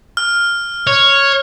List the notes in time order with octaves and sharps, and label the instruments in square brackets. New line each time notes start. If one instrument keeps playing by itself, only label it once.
[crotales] F6
[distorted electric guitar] C#5